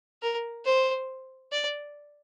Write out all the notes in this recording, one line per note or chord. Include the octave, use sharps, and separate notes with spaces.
A#4
C5
D5